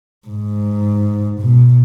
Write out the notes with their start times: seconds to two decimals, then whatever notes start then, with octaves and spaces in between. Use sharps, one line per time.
0.27 G#2
1.41 B2